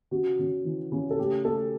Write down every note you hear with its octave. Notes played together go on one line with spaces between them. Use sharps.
C#3 F#4
C#3
E3
C#3
A4
A3 G4
A3 A4